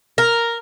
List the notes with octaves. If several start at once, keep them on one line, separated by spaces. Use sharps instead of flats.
A#4